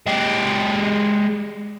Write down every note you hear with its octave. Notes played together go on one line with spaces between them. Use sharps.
G#3 G4